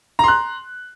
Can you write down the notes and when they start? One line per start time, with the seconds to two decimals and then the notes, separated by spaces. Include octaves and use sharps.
0.19 A#5
0.24 C6
0.28 F#6